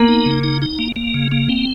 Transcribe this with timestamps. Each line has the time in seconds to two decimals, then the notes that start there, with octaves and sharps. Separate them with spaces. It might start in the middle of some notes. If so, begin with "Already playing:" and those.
Already playing: A#3 B3
0.08 D#4
0.26 C#3
0.43 D#4
0.62 D#4
0.79 A#3
0.96 A#3
1.14 C#3
1.32 A#3
1.49 C4